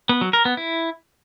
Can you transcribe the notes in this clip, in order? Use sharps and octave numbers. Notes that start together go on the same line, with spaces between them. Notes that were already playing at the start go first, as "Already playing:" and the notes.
B3
F#3
A#4
B3
E4